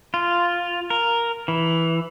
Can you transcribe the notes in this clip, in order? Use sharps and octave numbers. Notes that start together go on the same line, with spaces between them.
F4
A#4
E3